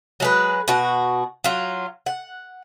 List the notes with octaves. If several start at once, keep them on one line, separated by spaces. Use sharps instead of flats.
F#3 G#3 B4
B2 F#4
F#3 F4
F#5